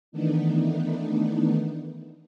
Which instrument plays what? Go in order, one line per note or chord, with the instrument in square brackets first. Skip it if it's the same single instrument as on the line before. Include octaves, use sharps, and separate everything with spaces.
[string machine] D#3 E3 A3 B3 D4 D#4